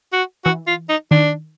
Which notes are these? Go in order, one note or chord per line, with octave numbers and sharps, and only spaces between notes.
F#4
E3 F#4
F4
D#4
D#3 D4